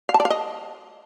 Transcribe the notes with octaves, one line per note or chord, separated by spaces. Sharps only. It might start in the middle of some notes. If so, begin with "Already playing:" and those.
F5
A5
D5
F5
D#5